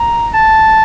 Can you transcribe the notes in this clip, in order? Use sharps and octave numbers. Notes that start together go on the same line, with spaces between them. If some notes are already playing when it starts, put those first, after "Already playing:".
Already playing: A#5
A5